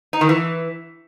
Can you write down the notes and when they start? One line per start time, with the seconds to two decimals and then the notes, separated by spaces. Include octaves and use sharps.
0.13 D#4
0.21 D#3
0.29 E3